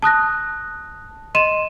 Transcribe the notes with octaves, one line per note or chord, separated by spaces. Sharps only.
A5 D#6 F#6 A#6
D#5 C6 D#7 E7